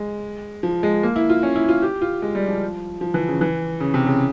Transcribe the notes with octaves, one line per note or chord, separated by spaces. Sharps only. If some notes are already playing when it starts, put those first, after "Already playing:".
Already playing: G#3
F3
G#3
A#3
E4
F4
C#4
E4
F4
G4
F4
G#3
G3
F3
F3
E3
C#3
E3
C#3
C3
C#3